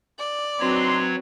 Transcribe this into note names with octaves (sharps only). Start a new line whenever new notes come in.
D5
F#3 C4 D4 D#4 F#4 B4 C#5 C6